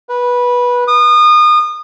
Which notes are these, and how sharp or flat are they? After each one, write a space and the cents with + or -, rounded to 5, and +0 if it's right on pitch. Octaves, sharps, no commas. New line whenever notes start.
B4 -15
D#6 -30